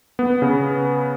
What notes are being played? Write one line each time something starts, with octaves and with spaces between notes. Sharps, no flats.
B3
C#3